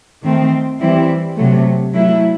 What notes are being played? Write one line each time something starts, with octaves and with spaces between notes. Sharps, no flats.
D#3 A3 C4
E3 G3 C4 E4
C3 F#3 A3
F#3 A3 E4